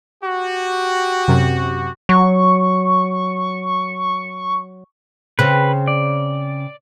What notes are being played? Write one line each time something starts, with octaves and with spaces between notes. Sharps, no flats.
F#4 G4
F#2 C3
F#3 C#6
C#3 C4 B4
D5